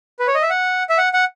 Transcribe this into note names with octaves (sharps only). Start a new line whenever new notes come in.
B4
C#5
D#5
E5
F#5
E5
F#5
F#5